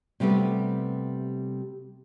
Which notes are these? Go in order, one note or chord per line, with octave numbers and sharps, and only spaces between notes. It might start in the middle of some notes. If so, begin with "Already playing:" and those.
C3 G3 A3 B3 G4